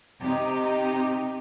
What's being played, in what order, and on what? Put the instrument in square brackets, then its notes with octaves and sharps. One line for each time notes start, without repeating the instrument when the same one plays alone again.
[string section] C3 D#4 G4